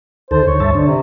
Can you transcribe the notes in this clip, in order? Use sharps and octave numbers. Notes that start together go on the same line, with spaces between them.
D2 D#3 A4 C5
D2 C#5
G2 E5 A5
D3 D4
C3